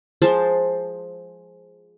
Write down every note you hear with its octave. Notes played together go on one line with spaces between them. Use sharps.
F3 G#3 C5 A5